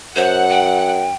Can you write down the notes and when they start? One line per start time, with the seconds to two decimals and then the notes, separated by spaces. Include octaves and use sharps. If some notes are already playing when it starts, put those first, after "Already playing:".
0.16 F#2 C5 F#5
0.49 G5